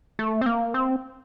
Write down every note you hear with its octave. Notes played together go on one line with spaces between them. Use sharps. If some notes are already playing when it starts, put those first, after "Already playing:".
A3
C4
A#3
C4